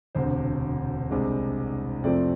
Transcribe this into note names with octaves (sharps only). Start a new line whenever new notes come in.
E1 D2 C3 C5
C2 C3 G#3 D4
F2 C3 F3 A3 C4 D5